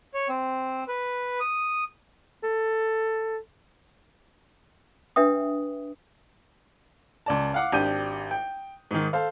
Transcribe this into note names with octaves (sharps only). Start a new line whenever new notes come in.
C#5
C4
B4
D#6
A4
D4 B4 E5 G5 D#6
C#2 D5 A5
F5 F#5 D6
G#1 D4 G4 G6 D#7
G5
G#2 D#3
A4 C5 F5